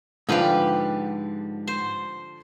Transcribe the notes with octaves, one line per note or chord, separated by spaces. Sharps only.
G#2 D3 F3 G4 B4 F5 G5
C5